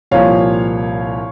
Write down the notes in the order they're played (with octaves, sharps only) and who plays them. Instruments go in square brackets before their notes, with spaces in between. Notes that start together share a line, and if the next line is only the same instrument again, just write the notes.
[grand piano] C2 A#2 F3 A#3 C#5 F5